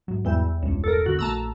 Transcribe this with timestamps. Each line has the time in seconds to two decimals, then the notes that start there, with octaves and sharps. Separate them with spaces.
0.08 G#2 F#3
0.25 E2 E3 G3
0.63 E1 C#2 G2
0.84 A4 A#4
1.06 E2 D3 B3 F#4
1.19 A#1 A3 A5 A#5 E6